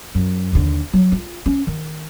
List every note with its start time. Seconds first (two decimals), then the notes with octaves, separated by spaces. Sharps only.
0.15 F#2
0.53 D#2 D3
0.93 F#3
1.12 F4
1.46 C#4
1.67 D#3